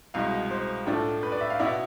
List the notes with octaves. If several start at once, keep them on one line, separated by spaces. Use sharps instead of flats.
C2 B2 G#3 F5
C5
A2 F3 A3 D4
B4
D5
E5
F5
B2 B3 E4 D5